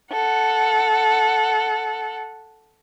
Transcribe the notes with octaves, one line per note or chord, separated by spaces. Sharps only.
A4 F#5